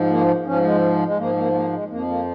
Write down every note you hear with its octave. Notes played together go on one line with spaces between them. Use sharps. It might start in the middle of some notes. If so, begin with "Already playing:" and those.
Already playing: G#2 F3
A#3
G#2 F3 C#4
G#3
G#3
G#2 F3 A#3
A#3
A#3
G#3
F2 F3 A#3
A#3